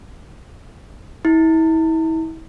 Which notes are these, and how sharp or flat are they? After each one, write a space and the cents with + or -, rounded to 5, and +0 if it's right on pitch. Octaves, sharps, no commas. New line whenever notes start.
E4 -35